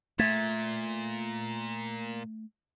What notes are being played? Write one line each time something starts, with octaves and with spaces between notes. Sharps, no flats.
A#2 A3 G#6 A6 B6